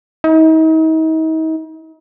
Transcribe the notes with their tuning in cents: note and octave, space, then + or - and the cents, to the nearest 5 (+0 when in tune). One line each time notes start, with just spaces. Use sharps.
D#4 +40